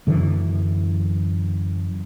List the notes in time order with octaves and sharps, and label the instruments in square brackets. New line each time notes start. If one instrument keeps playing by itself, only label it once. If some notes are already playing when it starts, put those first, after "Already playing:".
[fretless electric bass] F#2 D3 E3